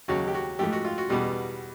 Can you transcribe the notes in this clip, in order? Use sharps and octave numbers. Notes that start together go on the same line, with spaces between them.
D#2 C#3 F#3 F#4
G4
F#4
G#2 F3 A3 G4
F#4
F4
F#4
E2 B2 G3